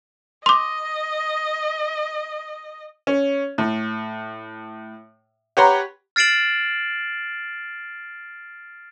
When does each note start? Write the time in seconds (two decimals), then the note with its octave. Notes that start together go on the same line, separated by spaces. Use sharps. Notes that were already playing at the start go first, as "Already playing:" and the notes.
0.46 D#5 C6 D6
3.07 C#4
3.58 A2
5.57 G4 B4 C#5 F#5 A#5 C6
6.16 F6 A6 C7 D7 E7 F#7